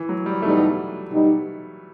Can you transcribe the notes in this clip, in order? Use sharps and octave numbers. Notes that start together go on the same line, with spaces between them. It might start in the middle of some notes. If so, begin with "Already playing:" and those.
Already playing: E3
F#3
G3
E2 B2 G3 A3 D#4 G4
B2 G3 D#4 G4